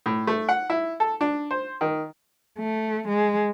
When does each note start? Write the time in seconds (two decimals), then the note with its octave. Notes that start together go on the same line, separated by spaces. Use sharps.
0.06 A2
0.27 A3
0.49 F#5
0.70 E4
1.00 A4
1.21 D4
1.51 C5
1.81 D#3
2.59 A3
3.08 G#3